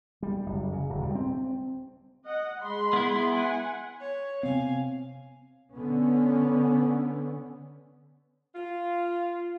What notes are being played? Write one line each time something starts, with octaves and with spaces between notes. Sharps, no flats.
G3
F#1
C#3
D1
G3
C4
D#5 F#5
G#3 B5 C6
B3 E4
F#5 G#5
C#5
C3 B3 C4 F5 G#5
D3 B3 C#4
F4